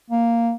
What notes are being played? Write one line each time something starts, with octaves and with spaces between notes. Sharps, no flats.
A#3